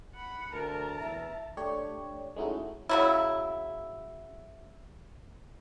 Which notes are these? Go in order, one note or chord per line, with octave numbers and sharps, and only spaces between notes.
F#5 B5
D2 A#4 A5 A#5
E2 E5
A3 D4 G4 C#5
G#3 A3 C#4 D#4 E4 F#4
C#3 F#3 E4